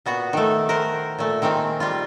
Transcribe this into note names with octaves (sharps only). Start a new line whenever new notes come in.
A#2 B3 F#4 F#5
D#3 A3
A#4 C5 F#5
A#2 A3
D#3 G#3 A#3 C4
G3 F4